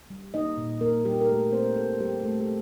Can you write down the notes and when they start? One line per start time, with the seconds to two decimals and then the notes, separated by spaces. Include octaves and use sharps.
0.10 G3
0.34 A#3 D#4 D#5
0.57 A#2
0.81 A#2 A#3 A#4
1.05 G3 A#3 G4
1.21 A#4
1.29 G3 A3 A4
1.52 A#3 C4 C5
1.76 A#2 A3 A4
2.00 A#2 G3 G4
2.24 A#2 A3 A4
2.40 A4